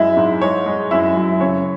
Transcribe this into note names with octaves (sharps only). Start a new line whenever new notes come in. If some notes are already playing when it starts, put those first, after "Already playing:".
Already playing: F#2 G#3 E4 E5
G#2
G#3 C#5
G#3
F#2 E4 E5
F#3
E5
C#3 C#5